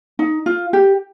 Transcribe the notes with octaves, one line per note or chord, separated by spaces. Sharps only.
D#4
F4
G4